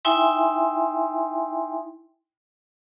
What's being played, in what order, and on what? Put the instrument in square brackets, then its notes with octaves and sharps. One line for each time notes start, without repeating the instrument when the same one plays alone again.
[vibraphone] D#4 E4 E5 G5 G#5 C6